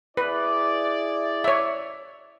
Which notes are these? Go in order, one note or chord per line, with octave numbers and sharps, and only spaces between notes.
E4 G#4 B4 D5
C#5 E5